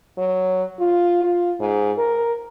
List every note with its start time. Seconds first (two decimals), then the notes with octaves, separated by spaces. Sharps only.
0.18 F#3
0.80 F4
1.24 F4
1.60 G#2
1.98 A#4